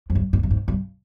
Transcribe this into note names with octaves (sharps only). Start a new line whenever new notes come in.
F2
G2
G#2
G2
G#2
G2